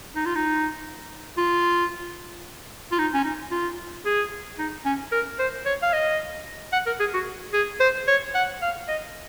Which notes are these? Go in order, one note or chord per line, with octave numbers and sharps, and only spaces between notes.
D#4
F4
D#4
F4
F4
D#4
C#4
D#4
F4
G#4
D#4
C#4
A#4
C5
C#5
F5
D#5
F#5
A#4
G#4
F#4
G#4
C5
C#5
F#5
F5
D#5